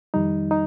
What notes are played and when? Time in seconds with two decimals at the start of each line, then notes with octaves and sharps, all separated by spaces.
0.14 F2 D#3 G3 D#4
0.51 D#4